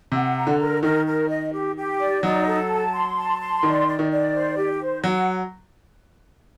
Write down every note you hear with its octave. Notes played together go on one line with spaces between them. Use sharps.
C3 F#5
A#5
D3
A#4
D#3 A#4
A#4
D#5
G4
G4
D5
F#3 D#4
A4
A5
C6
A5
C6
D#3 D5
D5
D#3
D5
C5
G4
C5
F#3 F#5